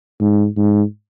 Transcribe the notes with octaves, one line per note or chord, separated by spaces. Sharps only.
G#2
G#2